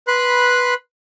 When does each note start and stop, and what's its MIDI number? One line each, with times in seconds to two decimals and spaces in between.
0.08 0.74 71
0.08 0.74 83
0.08 0.74 84
0.08 0.74 90